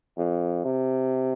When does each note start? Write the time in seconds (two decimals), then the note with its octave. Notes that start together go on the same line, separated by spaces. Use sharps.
0.17 F2
0.65 C3